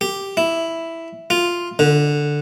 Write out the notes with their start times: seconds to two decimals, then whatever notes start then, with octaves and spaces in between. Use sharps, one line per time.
0.01 G4
0.37 E4
1.30 F4
1.79 D3